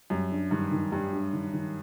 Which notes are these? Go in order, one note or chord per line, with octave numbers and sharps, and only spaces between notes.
F#2 G3
D4
G2 D#3
D#3
G2 G3
D4
D#3
D#3